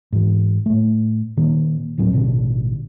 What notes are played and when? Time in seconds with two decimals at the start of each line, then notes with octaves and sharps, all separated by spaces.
0.13 G#2 E3
0.66 A2 A3
1.37 A#2 D#3 A#3
1.98 D1 A2 F#3 C4
2.13 A1 B2 D3